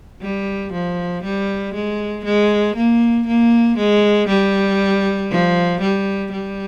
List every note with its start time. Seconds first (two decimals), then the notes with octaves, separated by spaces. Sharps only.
0.21 G3
0.72 F3
1.23 G3
1.74 G#3
2.25 G#3
2.76 A#3
3.27 A#3
3.77 G#3
4.28 G3
5.30 F3
5.81 G3
6.32 G3